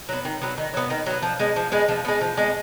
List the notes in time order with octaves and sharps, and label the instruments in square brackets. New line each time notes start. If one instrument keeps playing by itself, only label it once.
[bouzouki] F#3 B3
D#3
F#3 B3
D#3
F#3 B3
D#3
F#3 B3
F3
G#3 B3
F3
G#3 B3
F3
G#3 B3
F3
G#3 B3